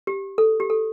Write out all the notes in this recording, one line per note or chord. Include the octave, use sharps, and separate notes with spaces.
G4
A4
G4
A4